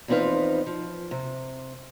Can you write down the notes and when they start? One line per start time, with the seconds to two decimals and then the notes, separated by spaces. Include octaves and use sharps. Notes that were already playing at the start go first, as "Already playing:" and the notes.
0.08 E2 F3 C4 D#4 B4 F5
0.67 F3
1.11 C3